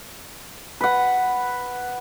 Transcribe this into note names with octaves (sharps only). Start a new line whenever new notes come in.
B4 F#5